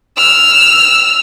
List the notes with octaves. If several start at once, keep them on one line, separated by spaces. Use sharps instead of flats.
E6 F6